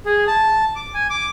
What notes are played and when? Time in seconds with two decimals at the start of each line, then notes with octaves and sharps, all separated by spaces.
0.06 G#4
0.27 A5
0.76 D6
0.94 G#5
1.10 D6